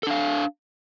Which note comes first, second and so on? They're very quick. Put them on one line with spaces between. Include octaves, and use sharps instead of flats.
A4 D4 F5